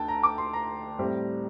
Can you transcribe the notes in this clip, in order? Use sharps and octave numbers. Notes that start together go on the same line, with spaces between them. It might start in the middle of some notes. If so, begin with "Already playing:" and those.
Already playing: D2 D3 A3 G5 A5
A#5
D6
C6
A#5
A2 G3 C4